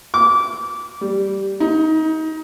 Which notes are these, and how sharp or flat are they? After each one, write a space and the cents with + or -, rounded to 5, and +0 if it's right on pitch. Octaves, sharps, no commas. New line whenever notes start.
D6 -20
G3 -5
D#4 +25